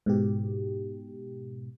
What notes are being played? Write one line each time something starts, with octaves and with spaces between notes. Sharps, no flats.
G#2 B2 G4